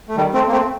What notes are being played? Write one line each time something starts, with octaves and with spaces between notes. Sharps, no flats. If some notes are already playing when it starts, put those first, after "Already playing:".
A3
D#3 G3
A3 C4
A#3
A3 C4